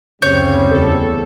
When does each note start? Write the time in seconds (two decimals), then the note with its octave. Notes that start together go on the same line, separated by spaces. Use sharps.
0.22 F#1 D2 C#3 G3 C4 C#5 G6
0.71 E2 A4